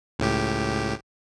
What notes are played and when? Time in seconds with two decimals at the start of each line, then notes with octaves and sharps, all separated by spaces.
0.19 C#2 A2 G4